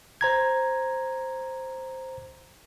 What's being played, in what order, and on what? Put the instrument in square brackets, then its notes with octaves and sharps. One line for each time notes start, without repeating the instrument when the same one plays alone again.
[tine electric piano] C5 A#5 G#6